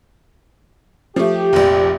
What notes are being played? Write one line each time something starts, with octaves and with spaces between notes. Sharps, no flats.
F3 A3 G4
F1 A#1